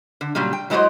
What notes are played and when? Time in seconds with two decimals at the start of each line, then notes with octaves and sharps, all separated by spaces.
0.21 D3
0.35 A#2 C#3 F#3 G3
0.53 G5
0.70 F#3 G#3 E4 F#4 C5 D#5